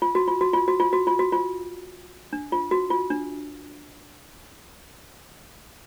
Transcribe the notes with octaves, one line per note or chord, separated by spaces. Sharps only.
F4
F#4
F4
F#4
F4
F#4
F4
F#4
F4
F#4
F4
D4
F4
F#4
F4
D4